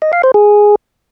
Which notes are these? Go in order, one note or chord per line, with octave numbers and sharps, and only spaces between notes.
D#5
F5
C5
G#4